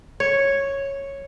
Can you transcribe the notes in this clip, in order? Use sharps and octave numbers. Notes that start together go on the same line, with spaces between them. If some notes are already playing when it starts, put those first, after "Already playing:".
C#5